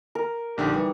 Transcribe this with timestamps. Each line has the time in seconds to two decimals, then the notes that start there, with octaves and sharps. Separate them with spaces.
0.15 A#4
0.58 A#1 D3 D#4 G4 G5 D#6
0.73 E3 G3